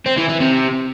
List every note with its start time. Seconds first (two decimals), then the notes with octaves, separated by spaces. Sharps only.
0.06 C4
0.17 E3
0.29 E3
0.40 C3